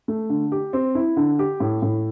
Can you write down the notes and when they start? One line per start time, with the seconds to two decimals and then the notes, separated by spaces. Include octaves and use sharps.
0.08 A3
0.29 D3
0.52 G4
0.73 C4
0.95 E4
1.17 D3
1.39 G4
1.60 A2
1.82 A2